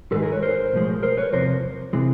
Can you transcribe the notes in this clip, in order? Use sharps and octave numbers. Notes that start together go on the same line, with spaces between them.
G#2 D#3 G#3 A4 B4
G#4 A#4
B4 C#5
A#4 C5
B1 A2 F3 G#3
A#4 C5
B4 C#5
E2 C3 F3 A#4 C5
C3 E3 G#3